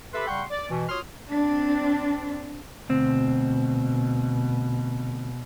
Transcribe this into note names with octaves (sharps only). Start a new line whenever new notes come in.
G4 A4 B4 E5 B5 C6
C#3 G3 F#5 G5 C6 C#6
D5
B2 E3
F4 F#4 C#5 C6 D#6 F6
C4 D4
D2 B2 C4